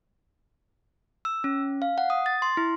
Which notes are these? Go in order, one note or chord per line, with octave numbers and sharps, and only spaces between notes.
E6
C#4
F5
F#5
D#6
A6
C6
E4